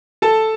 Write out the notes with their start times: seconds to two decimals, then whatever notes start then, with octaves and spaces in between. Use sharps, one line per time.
0.22 A4 A5